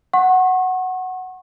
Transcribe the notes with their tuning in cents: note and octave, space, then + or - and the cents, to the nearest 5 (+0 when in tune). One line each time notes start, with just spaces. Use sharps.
F#5 +0 C#6 -40